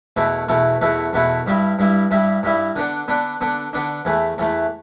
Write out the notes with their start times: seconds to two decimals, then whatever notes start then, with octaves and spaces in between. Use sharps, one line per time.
0.16 E2 B2 A3 E4
0.49 E2 B2 A3 E4
0.81 E2 B2 A3 E4
1.13 E2 B2 A3 E4
1.47 G2 G3 E4
1.79 G2 G3 E4
2.11 G2 G3 E4
2.43 G2 G3 E4
2.76 D3 B3 D4
3.08 D3 B3 D4
3.41 D3 B3 D4
3.73 D3 B3 D4
4.05 E2 E3 A3
4.38 E2 E3 A3